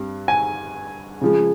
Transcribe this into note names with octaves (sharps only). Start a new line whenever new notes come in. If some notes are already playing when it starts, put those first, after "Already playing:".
Already playing: G2 G3 C4
G#5
C#3 F3 G#3